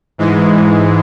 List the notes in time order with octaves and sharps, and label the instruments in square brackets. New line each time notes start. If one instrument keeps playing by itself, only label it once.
[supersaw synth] G#2 E3 G#3